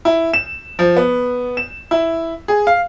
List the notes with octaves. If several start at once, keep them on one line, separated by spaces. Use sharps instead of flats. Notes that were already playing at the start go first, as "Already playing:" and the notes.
E4
E7
F3
B3
E7
E4
G#4
F5